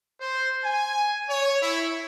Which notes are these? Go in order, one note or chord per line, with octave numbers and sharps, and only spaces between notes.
C5
G#5
C#5
E4